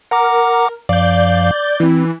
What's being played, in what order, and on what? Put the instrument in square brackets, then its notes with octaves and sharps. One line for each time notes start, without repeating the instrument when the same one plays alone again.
[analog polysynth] A#4 [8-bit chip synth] F#5 A#5 D6
[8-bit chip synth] F#2 F3 F5 [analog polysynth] D5 G6
[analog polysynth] E3 [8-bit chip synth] C4 E4